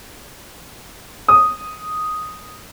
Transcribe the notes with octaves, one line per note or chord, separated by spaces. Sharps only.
D#6